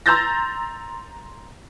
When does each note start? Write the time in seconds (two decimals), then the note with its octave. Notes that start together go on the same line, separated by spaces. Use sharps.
0.06 A#5 C6 E6 G6 A6 A#6